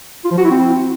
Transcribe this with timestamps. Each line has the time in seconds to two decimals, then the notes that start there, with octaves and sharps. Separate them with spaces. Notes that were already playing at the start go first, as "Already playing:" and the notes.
0.25 F4
0.31 F3
0.38 F#4
0.44 E4
0.51 C4